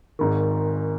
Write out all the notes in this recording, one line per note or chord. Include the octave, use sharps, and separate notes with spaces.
G#1 G#2 D#3